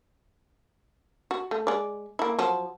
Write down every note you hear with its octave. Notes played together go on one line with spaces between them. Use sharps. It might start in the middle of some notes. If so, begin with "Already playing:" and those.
F#4
A3
G#3 D5
A#3 E4
F3 F#3